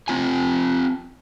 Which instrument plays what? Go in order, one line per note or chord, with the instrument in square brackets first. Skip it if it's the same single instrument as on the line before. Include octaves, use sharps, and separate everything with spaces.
[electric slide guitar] C4 F4 G#5